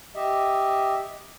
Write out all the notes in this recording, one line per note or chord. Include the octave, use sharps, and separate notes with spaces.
G4 D#5 E5